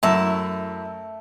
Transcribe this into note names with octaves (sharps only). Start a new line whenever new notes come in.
F#2 A3 E4 A5